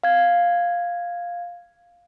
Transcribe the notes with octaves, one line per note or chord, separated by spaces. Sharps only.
F5 G#6